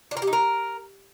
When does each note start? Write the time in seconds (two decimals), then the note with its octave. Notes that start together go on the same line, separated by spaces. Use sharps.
0.11 D4
0.17 A#4
0.22 G4
0.27 D#4
0.33 A#4